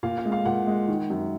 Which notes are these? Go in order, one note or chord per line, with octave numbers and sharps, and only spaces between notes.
A#2 F5
F5
G#3
F5
A#2 F#5
G#3
D#3
F#2